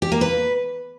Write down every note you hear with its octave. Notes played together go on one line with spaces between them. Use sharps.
G4
A#3
B4